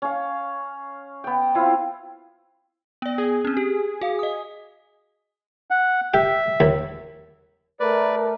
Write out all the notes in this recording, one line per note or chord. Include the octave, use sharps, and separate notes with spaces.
C#4 F5
B3 G5
C4 E4 F4 F5
B3 D5
G#4
C4 C#4
G4
F#4 F5
D#5 D#6
F#5
G4 E5
D#2
A3 A#4 B4 D5